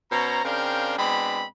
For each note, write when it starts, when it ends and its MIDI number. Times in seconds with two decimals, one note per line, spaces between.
0.12 0.44 47
0.12 0.44 61
0.12 0.44 72
0.12 0.44 82
0.45 0.97 49
0.45 0.97 60
0.45 0.97 62
0.45 0.97 70
0.45 0.97 77
0.45 0.97 79
0.99 1.43 47
0.99 1.43 56
0.99 1.43 60
0.99 1.43 62
0.99 1.43 83